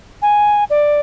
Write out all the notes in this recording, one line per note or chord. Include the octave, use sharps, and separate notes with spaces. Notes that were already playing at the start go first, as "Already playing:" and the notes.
G#5
D5